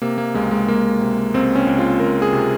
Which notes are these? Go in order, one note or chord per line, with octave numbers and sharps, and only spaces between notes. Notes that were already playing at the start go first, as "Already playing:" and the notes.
C3 A#3
A#3
C#2 G#3
G#3
C#2 A#3
C3
C#2 C4
C#4
C#2
F4
C#2 A#4
G#4
C3